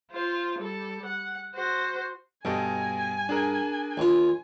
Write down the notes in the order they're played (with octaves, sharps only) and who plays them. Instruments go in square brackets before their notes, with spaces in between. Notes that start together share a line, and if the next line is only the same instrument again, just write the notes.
[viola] F4 C5
G3 A4
F#5
F#4 C5
[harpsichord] G2 [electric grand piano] B2 A4 D#5 [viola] G#5
[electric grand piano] D4 G#4 A#4
[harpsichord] D#2 F4